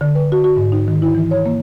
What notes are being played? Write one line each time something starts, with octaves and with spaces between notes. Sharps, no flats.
D3
B4
F#4
F#4
G#2
D#4
D#3
E4
E3
C#5
A#3